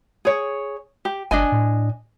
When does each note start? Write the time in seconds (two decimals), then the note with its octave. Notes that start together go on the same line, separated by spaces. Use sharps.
0.25 G#4 C#5
1.05 G4
1.31 G1 D4 D#5 G#5
1.52 A2